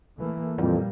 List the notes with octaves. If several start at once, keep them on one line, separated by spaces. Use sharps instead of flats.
E3 A3 A#3
F2 A#2 E3 G3 A#3